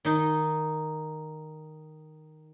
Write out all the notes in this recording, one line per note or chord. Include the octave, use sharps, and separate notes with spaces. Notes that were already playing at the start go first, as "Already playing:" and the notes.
D#3 D#4